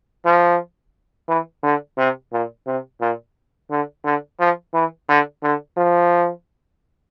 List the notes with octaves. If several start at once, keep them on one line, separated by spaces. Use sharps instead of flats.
F3
E3
D3
C3
A#2
C3
A#2
D3
D3
F3
E3
D3
D3
F3